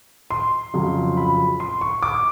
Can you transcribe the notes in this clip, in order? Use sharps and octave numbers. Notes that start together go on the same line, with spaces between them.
C6
F2 C#3 F#3
B5
C6
C#6
D6